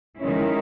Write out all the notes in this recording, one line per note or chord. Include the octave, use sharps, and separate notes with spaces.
D#3 G#3 C#4 E4